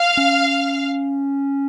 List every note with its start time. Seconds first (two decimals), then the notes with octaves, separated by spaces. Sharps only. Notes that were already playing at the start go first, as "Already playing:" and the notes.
Already playing: F5
0.17 C#4